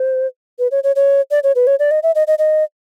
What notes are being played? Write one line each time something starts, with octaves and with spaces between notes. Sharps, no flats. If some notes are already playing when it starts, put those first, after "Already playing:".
Already playing: C5
B4
C#5
C#5
C#5
D5
C#5
B4
C#5
D5
D#5
E5
D#5
D#5
D#5